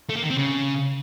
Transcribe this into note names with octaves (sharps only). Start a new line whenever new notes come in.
A3
A#3
D#3
C4
C#3